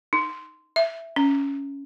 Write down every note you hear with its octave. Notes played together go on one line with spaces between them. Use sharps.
D#4
E5
C#4